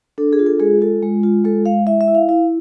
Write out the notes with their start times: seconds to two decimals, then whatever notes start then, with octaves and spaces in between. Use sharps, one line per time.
0.18 D4 A4
0.33 G#4
0.39 F4
0.46 A4
0.60 G#3 G#4
0.81 F4 A4
1.03 G#3
1.23 F4
1.45 G#3 A4
1.66 G#3 F5
1.86 E4 E5
2.01 E5
2.08 E4
2.15 F5
2.29 E4 F5